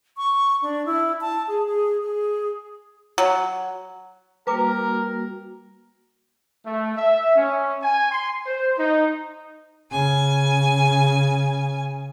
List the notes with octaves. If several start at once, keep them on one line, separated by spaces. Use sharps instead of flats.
C#6
D4
E4
A5
G#4
G#4
G#4
F#3
G3 A#3 F#4 A#4 B4 A#5 D6
A3
E5
C#4
G#5
C6
C5
D#4
C#3 G#5